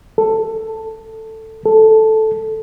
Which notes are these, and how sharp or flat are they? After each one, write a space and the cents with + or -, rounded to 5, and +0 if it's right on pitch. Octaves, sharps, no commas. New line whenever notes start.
A4 +10
A4 -5